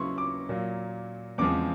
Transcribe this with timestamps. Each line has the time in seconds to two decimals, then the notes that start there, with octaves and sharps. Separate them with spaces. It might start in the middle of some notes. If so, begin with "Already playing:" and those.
Already playing: C#3 F#3 B3 E4 C6 C#6
0.18 D6
0.49 A#2 F#3 A#3
1.38 E2 C#3 F3 G#3 C4 D6